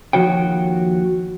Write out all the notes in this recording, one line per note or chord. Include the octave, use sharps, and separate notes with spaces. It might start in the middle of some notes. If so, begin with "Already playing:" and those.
D#2 F3 F#4 C#5 G5